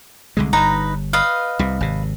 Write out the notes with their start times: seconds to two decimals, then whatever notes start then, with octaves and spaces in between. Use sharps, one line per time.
0.37 C2 D3 G#3
0.53 G1 G2 D#4 B4 A#5
1.13 B4 D#5 F5
1.59 C2 C3
1.81 G#1 C3